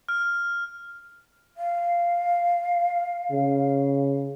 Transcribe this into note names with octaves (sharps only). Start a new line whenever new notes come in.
F6
F5
C#3